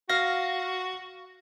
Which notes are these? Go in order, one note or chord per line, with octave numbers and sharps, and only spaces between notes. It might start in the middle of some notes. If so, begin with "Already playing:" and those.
F#4 F5 A#6